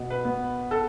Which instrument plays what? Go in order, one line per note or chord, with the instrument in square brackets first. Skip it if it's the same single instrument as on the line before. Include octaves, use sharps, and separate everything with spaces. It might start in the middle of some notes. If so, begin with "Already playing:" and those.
Already playing: [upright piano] B2
[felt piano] B4
[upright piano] B3
[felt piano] A4